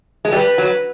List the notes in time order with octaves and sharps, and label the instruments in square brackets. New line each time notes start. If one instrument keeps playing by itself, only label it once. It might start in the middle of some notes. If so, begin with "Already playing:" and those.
[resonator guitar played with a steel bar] G#3
[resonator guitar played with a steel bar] G3 [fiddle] B4
[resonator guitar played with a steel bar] F#3